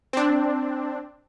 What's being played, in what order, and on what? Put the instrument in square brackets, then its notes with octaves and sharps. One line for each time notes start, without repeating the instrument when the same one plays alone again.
[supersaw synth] C4 D4